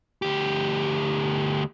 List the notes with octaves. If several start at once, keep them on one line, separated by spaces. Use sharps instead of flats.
D2 G4